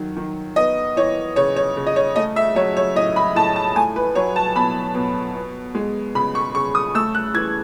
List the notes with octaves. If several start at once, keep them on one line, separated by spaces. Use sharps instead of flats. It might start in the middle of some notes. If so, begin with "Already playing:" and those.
Already playing: D#3 F#3
D#3
B3 D#5
E3 C#5
C#3 C#5
C#5
C#3
D#5
C#5
A3 D#5
E5
F#3 C#5
C#5
A2 D#5
B5
A2 A5
A5
A3 G#5
B4
F#3 C#5
A5
B2 B5
B2
B3
G#3
C#3 B5
C#6
C#3 C#6
D#6
A3 E6
F#6
E3 G#6